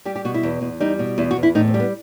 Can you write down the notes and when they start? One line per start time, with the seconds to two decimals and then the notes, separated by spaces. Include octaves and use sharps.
0.05 G3 G4
0.16 G4
0.25 B2 F#4
0.34 E4
0.43 E2
0.61 E2
0.80 G3 D#4
0.99 B2
1.18 E2 E4
1.31 F#4
1.37 E2
1.43 E4
1.55 A2 D#4
1.68 C4
1.74 G3
1.80 B3